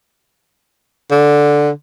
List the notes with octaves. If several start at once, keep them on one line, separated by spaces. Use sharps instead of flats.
D3